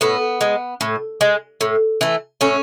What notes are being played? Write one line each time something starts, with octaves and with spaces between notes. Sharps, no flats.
A2 B3
G#3
A2
G#3
A2
E3 A3
A2 C#4